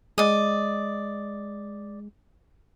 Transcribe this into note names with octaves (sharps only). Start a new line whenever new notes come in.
G#3 D5 D#5